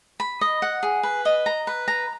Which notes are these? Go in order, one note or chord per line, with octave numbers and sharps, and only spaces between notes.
B5
D#5
F#5
G#4
B4
D#5
A#5
B4
A#5